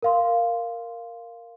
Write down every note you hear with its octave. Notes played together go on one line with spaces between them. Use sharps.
A#4 F5 C6